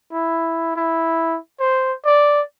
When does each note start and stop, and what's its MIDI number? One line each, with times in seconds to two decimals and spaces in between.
0.13 0.72 64
0.76 1.37 64
1.60 1.93 72
2.06 2.41 74